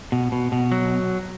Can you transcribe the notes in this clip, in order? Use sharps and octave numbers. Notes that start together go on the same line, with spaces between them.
B2
B2
B2
F#3